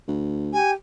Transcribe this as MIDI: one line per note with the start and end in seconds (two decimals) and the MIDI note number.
0.08 0.56 38
0.52 0.72 67
0.52 0.70 80